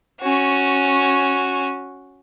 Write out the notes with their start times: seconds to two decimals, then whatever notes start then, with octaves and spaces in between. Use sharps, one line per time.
0.21 C#4 F#4